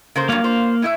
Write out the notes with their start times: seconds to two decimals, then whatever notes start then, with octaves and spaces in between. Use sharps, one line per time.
0.16 C#3 A#3 C5
0.29 G2 B2 F#3 A#3 F5
0.44 F4 C5
0.82 A2 E4 E5